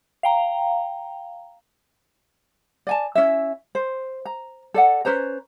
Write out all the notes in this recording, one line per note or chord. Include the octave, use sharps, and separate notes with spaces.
F5 G5 A#5
D5 G#5 A5
C#4 E4 E5
C5
A#5
A4 D5 F#5
C#4 B4 C5 A#5